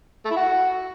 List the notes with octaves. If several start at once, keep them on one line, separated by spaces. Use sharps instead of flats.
A3
E4
F#4